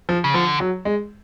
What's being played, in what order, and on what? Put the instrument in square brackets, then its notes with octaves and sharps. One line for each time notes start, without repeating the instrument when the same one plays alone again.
[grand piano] F3
[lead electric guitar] C#3
[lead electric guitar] D3 [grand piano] F3
[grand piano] F#3
G#3